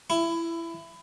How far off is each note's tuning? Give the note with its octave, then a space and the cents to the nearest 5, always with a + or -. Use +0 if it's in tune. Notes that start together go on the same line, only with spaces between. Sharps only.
E4 +20